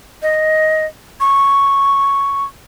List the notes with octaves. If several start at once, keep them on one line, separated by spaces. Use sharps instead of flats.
D#5
C#6